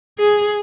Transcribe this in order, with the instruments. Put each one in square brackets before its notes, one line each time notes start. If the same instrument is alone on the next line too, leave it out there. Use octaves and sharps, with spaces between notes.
[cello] G#4